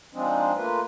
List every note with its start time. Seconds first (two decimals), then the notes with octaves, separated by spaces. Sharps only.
0.14 F3 G#3 C4 D4 D#4
0.57 A3 A#3 F4 B4